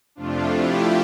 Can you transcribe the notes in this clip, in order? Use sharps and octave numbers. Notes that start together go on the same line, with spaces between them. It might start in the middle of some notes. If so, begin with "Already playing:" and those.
F2 C3 F3 A3 D4 F4
E4 G4